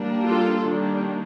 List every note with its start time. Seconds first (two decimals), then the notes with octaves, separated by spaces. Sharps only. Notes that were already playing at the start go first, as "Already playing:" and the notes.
Already playing: G3 A#3 D4
0.25 F4 A4
0.63 D#3 G3 A#3 D4